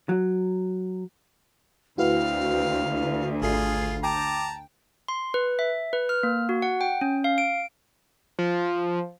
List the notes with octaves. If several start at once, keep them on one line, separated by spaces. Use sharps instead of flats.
F#3
D2 C4 E4 F#4 B4 F5
G#1 F4 G#4 A4 C7
G5 A5 A#5 D6
C6
B4
E5
B4
F6
A#3
F#4
F#5
G5
C#4
F5
D7
F3